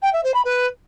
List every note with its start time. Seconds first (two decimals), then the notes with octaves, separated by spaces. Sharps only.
0.02 G5
0.13 E5
0.23 C5
0.34 B5
0.45 B4